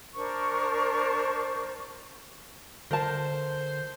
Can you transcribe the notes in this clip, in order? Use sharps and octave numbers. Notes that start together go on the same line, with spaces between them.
D4 A#4 C5 C#6
D3 A#4 C5 A5